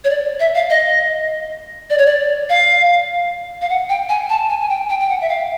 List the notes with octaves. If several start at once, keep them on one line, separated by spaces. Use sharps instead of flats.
C#5
D5
E5
F5
D#5
D5
C#5
D5
F5
F5
F#5
G5
G#5
A5
G#5
G#5
G5
G5
G5
F#5
E5
F5